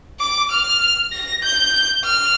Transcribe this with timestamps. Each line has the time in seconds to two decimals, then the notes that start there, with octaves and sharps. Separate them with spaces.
0.20 D6
0.51 F6
1.12 A#6
1.43 G6
2.05 F6